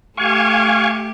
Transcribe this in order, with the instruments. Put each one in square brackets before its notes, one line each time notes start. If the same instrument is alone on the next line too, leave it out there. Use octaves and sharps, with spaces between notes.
[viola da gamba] A3 G4 [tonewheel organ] F5 G#5 C#6